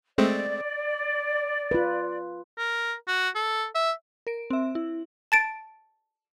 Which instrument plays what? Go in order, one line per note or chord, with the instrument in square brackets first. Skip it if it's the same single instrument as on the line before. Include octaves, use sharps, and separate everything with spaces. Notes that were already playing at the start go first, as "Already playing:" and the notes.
[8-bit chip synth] G#3 A3 C4 [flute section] D5
[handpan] F4 B4
[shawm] A#4
F#4
A4
E5
[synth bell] A#4 D7
C4 E5
E4
[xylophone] A5 A6 D7